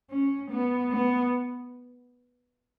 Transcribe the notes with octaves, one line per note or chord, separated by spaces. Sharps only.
C#4
B3
B3